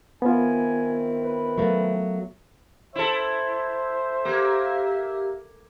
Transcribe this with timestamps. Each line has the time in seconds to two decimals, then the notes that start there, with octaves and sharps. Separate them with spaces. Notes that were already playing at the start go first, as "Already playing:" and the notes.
0.22 D#3 B3 C4 E4 F4 G#5
1.23 B4
1.58 F#3 A3 A#3
2.96 E4 A4 C5 E5
4.25 A#3 G4